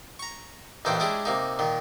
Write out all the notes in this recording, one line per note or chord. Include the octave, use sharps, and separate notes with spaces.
A#5 C#6
A1 A#2 E3 D#4 C5 G5
G#3 C#4 D4 E4 G4 G#4
C3 A#3 D#4
A#2 D#3